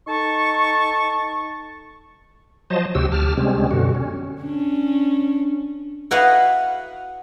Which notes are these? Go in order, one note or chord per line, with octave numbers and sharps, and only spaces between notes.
D#4 A4 A5 C#6
F3 F#3 C5 D#5 A5
D2 C3 F#4 G4 E6
D2 G4 A5 F6
C3 G3 G#3 C4 C#4
F#2 B2 D3 F#4
C#4
C#4 D4
E4 F#4 B4 D#5 F5 F#5